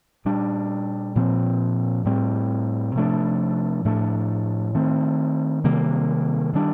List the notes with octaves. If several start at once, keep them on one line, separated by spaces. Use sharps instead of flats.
A#2 G3 D4
A#2 F3 C4
A2 G3 C4
C3 F3 A3 D4
A2 F3 A3 D4
D#3 A3 C4
C3 D#3 G3 A#3
D#3 G3 D4